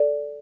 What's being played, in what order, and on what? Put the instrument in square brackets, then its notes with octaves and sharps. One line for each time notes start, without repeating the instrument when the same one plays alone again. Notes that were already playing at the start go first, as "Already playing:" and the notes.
Already playing: [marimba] A4 D5